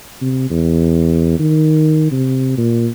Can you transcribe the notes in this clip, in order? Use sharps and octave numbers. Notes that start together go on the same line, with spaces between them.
C3
E2
D#3
C3
A#2